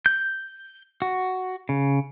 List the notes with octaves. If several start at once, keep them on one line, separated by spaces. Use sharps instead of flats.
G6
F#4
C#3